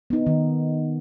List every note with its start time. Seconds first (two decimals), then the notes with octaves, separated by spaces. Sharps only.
0.10 B3 D#4
0.27 D#3